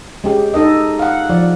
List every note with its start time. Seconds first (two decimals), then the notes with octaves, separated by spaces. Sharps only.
0.24 G#3 C#4 G4
0.54 D#4 A4 D#5
0.99 F5 F#5
1.30 F3 D5